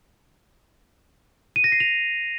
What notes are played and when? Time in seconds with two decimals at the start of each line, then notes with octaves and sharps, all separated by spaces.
1.56 D#7
1.64 A#6
1.72 C7
1.80 F7